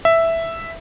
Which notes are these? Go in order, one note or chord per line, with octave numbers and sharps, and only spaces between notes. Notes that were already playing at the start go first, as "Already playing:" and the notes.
E5